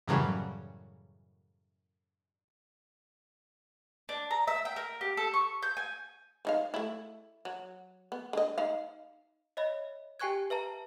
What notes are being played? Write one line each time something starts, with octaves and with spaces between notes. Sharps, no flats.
F#2 A2 C#3 E3 F#3 G3
D4
A#5
E5
G5
A#4
G4
A4
C#6
G6
G#5
F3 D#4 F5
A3 E4
F#3
B3
D3 D#5
D#4 F5
C#5 D#5 E5 B5
G4 G5 G#5 C#6 F#6 G#6
B4 E5 A5 A#5